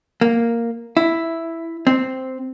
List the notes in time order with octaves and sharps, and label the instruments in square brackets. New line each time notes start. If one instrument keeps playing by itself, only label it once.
[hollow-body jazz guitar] A#3
E4
C4